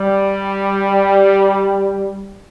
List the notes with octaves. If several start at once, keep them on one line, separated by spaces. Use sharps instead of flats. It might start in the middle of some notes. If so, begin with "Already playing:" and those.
Already playing: G3